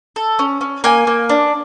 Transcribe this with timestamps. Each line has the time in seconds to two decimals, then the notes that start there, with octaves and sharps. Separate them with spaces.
0.16 A4
0.39 C#4
0.61 C#4
0.84 A#3 G#5
1.07 A#3
1.29 D4